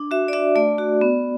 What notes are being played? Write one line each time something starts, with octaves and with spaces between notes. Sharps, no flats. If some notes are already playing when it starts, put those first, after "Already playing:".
Already playing: D4
F#4 E5
D5
D4 E5
A3 D5
F#4
B3